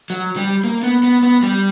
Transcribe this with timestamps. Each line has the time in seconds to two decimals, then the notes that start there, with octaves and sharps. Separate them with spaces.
0.10 F#3
0.36 G3
0.64 A#3
0.83 B3
1.03 B3
1.23 B3
1.43 G3